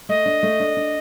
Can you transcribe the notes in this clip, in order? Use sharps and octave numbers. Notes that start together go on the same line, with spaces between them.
A3 D#5
D4
A3
D4
D4